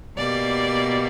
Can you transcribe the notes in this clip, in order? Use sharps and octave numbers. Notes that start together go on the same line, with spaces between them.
B2 G3 A#3 D5